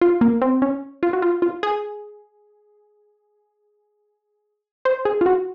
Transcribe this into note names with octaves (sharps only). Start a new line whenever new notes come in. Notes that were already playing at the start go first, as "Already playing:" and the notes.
F4
A#3
C4
C#4
F4
F#4
F4
F4
G#4
C5
G#4
F4
F#4